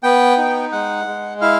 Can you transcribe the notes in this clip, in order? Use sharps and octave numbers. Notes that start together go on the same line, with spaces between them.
B3 G5
D#4
G#3 F#5
G#3
E4 F5